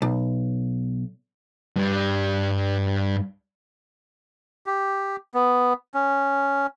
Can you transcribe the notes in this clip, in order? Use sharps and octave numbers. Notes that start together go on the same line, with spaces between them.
B1
G2 G3
G4
B3
C#4